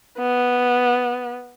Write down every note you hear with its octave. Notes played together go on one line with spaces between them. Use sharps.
B3